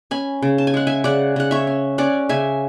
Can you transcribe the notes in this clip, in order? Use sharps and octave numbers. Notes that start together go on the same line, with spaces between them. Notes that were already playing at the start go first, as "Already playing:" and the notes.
C#4 G#5 B5
C#3
A5
G#5
G#3 F#5
E5 G#5
C#3 D5 F#5
C#3 F#5
C#5 E5
C#4
C#4 D5 F#5
C#3 E5 G#5